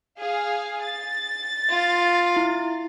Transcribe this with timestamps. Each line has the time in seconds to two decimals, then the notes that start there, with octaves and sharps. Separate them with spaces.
0.19 G#4 F5
0.82 A6
1.70 F4
2.36 E4